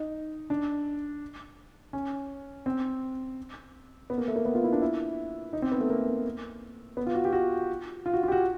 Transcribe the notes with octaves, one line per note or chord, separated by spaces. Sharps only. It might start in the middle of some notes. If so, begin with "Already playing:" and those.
Already playing: D#4
D4
C#4
C4
B3
A#3
A3
A#3
B3
F4
E4
D4
E4
D#4
C4
B3
A3
A#3
B3
F4
F#4
G4
F#4
F4
F#4
F4
G4
F#4